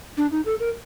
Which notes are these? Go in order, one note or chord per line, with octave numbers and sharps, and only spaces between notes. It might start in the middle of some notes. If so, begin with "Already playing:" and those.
D4
D#4
A4
A#4